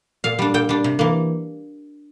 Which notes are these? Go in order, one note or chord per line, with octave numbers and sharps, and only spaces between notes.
A#2 F5
G3 D4
A#2 G5
G3 D4
C3
E3 A#3